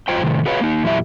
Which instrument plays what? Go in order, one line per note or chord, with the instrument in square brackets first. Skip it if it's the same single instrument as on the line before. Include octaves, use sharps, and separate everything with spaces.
[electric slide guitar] G2 F#3 F4 C5 G5
A2 C3 D#3
F#4 G#4 B4 C#5 F5
A#3 D#4
E2 A#2 F#3 E4 G4 E5